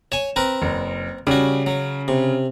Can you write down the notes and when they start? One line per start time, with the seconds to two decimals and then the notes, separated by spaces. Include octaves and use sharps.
0.12 C#5 G#5 E7
0.36 C4 A#4 B4
0.62 F#1
1.27 C#3 G3 F#4
1.66 F#3
2.08 C3